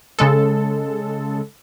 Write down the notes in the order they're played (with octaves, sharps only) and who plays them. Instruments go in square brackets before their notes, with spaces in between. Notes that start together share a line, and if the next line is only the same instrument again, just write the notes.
[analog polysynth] C#3 G#3 A4